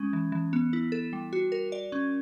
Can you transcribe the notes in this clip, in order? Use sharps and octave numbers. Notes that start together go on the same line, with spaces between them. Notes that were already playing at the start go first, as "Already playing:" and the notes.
Already playing: G#3 C#4
E3
E3
B3
E4
A4
G3
F#4
A#4
D5
C#4